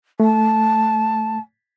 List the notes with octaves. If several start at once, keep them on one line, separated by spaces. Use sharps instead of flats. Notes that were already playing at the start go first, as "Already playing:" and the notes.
A3 A5